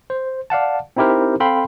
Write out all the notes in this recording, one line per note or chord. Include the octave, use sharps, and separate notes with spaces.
C5
D5 F5 F#5 A5
C4 D#4 E4 G4 A#4 C5
C4 A4 F5 G5 B5 C6